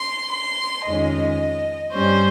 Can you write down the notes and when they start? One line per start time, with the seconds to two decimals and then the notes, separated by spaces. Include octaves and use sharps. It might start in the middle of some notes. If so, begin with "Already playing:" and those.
Already playing: C6
0.32 C6
0.85 F2 D#3 G#3 C#4 D#5
1.92 G2 G3 C#4 C5